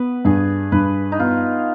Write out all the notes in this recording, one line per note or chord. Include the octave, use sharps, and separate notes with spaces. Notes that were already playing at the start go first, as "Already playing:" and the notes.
Already playing: B3 B4
G2 G#4
G2 B4
D#4
B3 F4